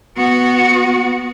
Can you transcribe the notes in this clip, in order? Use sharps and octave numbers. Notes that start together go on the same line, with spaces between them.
B3 F#4